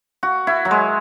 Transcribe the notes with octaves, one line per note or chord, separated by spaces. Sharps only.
F#4
E4
F#3
G#3